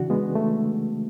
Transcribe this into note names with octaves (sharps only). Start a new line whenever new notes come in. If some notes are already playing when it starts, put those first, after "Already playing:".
Already playing: C#3 E3 D4 F#4
G#3 B3
A3